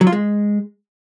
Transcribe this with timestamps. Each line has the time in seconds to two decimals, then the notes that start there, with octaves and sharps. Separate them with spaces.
0.01 F#3
0.07 F4
0.12 G#3